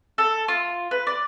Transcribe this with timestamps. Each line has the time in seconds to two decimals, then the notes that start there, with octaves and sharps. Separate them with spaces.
0.18 A4
0.48 F4
0.91 B4
1.07 D5